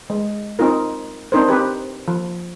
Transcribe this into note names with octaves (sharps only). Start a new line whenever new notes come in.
G#3
C4 D#4 F4 A#4
C4 D4 D#4 A#4 C5
C4 G4 B4
F3